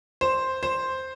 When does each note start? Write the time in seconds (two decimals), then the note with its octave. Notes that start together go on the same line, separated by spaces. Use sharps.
0.21 C5
0.63 C5